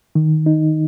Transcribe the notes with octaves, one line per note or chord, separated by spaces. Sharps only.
D#3
D#4